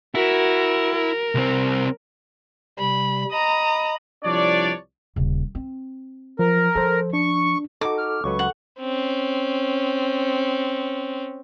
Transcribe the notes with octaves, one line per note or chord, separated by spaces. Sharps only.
E4 F#4 A#4
A#4
C2 C4
C3 G3 B5
D#5 A#5 B5 D#6
C2 F3 D4 C#5 D5
D#1 C#3
C4
F3 A#4
F3 A4 C5
D4 C#6
D#4 F#4 A4 D6
F6
C#2 F#3 B4 C#6
F#5
C4 C#4